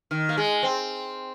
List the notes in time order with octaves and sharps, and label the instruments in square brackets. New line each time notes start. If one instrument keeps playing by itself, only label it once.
[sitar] D#3
A#3
G#3
C4